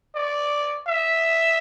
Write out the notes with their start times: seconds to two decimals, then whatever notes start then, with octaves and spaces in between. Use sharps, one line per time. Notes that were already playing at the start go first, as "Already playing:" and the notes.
0.15 D5
0.87 E5